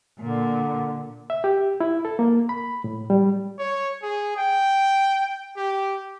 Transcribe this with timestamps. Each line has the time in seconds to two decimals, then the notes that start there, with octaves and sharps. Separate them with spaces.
0.20 A#2 D3
1.30 E5
1.44 G4
1.80 E4
2.05 A4
2.19 A#3
2.49 B5
2.84 A2
3.10 G3
3.58 C#5
4.03 G#4
4.37 G5
5.56 G4